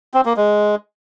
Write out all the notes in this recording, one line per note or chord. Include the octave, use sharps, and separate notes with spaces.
C4
A#3
G#3